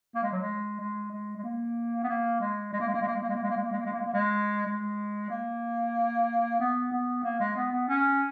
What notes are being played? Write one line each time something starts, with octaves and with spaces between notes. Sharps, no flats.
A#3
G#3
F#3
G#3
G#3
G#3
G#3
A#3
B3
A#3
G#3
G#3
A#3
G#3
A#3
G#3
A#3
G#3
A#3
G#3
A#3
G#3
A#3
G#3
A#3
G#3
A#3
G#3
A#3
G#3
A#3
G#3
G#3
A#3
B3
B3
A#3
G#3
B3
B3
C#4